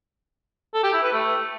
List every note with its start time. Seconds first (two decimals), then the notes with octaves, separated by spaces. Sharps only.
0.74 A4
0.84 G4
0.93 E4
1.03 B4
1.13 A3